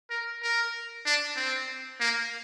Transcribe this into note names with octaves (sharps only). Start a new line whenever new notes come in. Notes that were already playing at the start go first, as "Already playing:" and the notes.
A#4
A#4
D4
C4
A#3